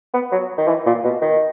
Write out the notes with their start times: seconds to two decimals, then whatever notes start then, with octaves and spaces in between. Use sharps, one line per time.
0.14 B3
0.32 F#3
0.58 D#3
0.68 E3
0.86 A#2
1.04 B2
1.22 D#3